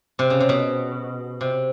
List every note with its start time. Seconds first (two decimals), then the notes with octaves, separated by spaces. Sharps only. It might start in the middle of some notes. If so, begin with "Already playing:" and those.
0.19 C3
0.30 C#3
0.40 C3
0.49 B2
1.41 C3